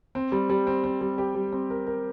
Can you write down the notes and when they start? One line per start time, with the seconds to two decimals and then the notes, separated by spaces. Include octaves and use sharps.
0.15 C4
0.32 G3
0.50 G3
0.67 C4
0.84 C4
1.01 G3
1.18 G4
1.35 G3
1.53 C4
1.70 A#4
1.87 A#4